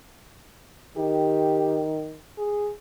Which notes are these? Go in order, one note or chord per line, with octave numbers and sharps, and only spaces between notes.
D#3 G4
G#4